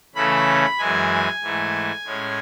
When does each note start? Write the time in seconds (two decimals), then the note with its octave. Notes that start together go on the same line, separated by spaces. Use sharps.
0.15 C#3 E3 A3 C#4 B5
0.79 F#2 E3 G#3 G#5
1.41 G#2 E3 A3
2.04 A2 G#3 C#4